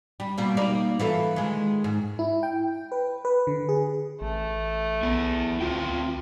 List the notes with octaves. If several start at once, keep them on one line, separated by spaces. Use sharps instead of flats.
G3
B2 G3 A#3
A#3 D#4 D5
E3 F4 A4
D#3 G#3
G#2
E4
G5
B4
B4
D3
G#4
A1 A3
B1 B3 E4
D2 C4 F4 F#4 G5